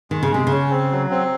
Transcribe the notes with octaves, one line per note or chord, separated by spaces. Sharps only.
D#3 G#3
C#3
C3 G#3
C#3 C#4
C4
F#3
C4